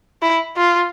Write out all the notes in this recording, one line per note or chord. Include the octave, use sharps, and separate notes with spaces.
E4
F4